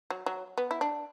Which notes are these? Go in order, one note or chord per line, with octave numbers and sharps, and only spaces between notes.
F#3
F#3
B3
E4
D4